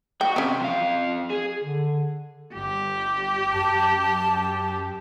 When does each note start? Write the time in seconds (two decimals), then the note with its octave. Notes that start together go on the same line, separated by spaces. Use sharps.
0.21 F#4 G5
0.36 C3 C4 C#4
0.60 F2 F5
1.30 G#4
1.62 D3
2.55 G1 G4
3.53 F#2 A5